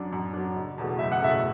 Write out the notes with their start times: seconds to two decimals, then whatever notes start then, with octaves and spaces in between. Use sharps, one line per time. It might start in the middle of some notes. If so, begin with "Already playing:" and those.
Already playing: F#2 F#3 D4
0.13 F#2
0.33 F#3 D4
0.56 F#1
0.78 E2 B2 A3
0.99 F#1 E5
1.12 F#5
1.22 E2 B2 A3 E5